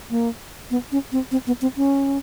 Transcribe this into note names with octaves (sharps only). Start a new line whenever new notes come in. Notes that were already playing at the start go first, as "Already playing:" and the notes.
A#3
B3
C#4
C4
C4
B3
C4
C#4